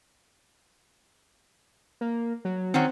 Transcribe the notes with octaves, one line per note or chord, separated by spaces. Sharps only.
A#3
F#3
D#3 F#3 C4 C#4